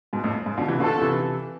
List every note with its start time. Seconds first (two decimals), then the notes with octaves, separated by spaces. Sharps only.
0.13 G#2 B2
0.24 F2 A2
0.46 G#2
0.58 B2 D3
0.68 C3 E3
0.79 B2 D3 A3 D4 F4 A4
1.01 C3 E3